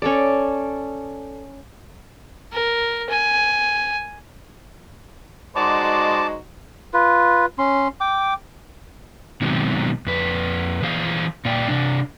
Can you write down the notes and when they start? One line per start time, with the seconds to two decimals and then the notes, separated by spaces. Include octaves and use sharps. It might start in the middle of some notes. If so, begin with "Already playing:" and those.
0.02 C#4 A4 D5
2.52 A#4
3.10 G#5
5.56 G#3 D#4 F#4 C5 D5 A5 D6
6.94 F4 B4
7.58 C#4 C6
8.01 G5 D6
9.42 B2 D#3 F#3 G#3 C4
10.06 F2 B4
10.82 E3 G#4 C5 F5
11.45 A#2 A#3 D5 F5 G5
11.68 C3 D4